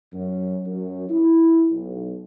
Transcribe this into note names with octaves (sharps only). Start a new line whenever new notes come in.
F#2
F#2
E4
B1